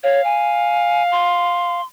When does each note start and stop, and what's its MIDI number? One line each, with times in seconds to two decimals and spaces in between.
0.03 0.21 73
0.03 1.80 77
0.24 1.03 80
1.12 1.84 84